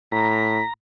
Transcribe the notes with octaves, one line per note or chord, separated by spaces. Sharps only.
A2 A#5 B6